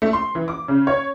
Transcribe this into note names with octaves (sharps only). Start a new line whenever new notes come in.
A3
C6
E3
D6
C#3
C#5